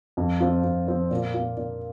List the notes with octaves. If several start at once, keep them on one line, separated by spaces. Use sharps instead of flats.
F2
F3 C4 F4
F2
F3 C4 F4
A#2
A#3 F4
A#2